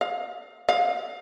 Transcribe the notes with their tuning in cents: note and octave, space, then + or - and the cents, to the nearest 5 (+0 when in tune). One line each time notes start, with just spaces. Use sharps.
F5 +25
F5 +25